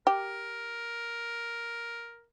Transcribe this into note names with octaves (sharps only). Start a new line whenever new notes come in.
G4 A#4